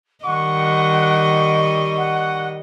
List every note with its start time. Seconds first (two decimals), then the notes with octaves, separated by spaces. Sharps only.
0.25 D#3 G3 D#5 F#5 C#6
1.98 F#5